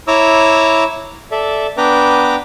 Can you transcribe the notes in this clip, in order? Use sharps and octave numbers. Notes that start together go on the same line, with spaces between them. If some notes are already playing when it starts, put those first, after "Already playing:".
E4 C#5 A#5 D6 E6
A4 D5 E5
B3 D4 B4 G5 A#5 D6